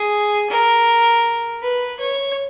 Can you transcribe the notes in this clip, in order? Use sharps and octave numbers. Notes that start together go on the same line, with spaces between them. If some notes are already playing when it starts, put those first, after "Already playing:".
Already playing: G#4
A#4
B4
C#5